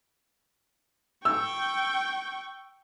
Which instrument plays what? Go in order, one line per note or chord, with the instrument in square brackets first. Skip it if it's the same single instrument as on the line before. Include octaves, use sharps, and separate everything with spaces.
[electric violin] G5 C#6 [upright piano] E6